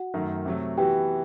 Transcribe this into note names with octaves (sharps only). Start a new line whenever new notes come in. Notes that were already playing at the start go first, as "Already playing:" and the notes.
Already playing: F#4 F#5
F#2 D#3 A3 D#4
C3 F#3 A3
E3 B3 F#4 G4 G5